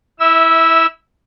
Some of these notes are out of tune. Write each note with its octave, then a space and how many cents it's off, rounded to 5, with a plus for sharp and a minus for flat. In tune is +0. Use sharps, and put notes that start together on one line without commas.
E4 -10 E5 -25 E6 +0